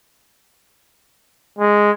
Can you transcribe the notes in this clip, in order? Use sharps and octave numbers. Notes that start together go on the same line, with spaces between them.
G#3